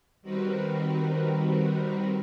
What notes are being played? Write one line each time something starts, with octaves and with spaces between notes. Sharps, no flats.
D#3 G3 C4 F#4 A#4 B4